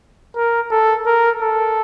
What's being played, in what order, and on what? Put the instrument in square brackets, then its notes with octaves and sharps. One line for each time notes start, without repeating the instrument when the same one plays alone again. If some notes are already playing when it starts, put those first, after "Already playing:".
[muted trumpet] A#4
A4
A#4
A4